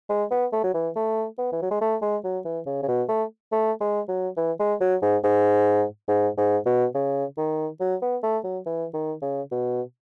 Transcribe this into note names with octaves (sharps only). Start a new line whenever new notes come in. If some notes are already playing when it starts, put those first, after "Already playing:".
G#3
B3
A3
F#3
E3
A3
B3
E3
F#3
G#3
A3
G#3
F#3
E3
C#3
C#3
B2
A3
A3
G#3
F#3
E3
G#3
F#3
G#2
G#2
G#2
G#2
B2
C#3
D#3
F#3
B3
A3
F#3
E3
D#3
C#3
B2